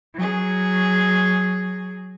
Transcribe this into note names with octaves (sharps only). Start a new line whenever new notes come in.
F#3 G#4